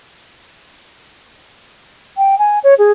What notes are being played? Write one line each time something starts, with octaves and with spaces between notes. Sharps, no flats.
G5
G#5
C#5
G#4